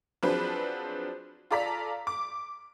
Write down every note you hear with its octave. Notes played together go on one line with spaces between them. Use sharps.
F3 F#3 C4 D4 G#4 B4
F4 A4 D5 A#5 B6
D6